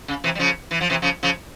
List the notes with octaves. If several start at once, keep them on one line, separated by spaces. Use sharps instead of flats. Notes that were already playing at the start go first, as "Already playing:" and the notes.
C#3
C3 E3
G3
C#3 F3
E3
F3
C3 E3
C#3 F3
C#3 F3